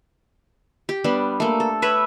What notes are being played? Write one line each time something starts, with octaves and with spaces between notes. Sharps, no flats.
G4
G3 B3 D4
A3 A#3
A4
B4 C#5 E5 B5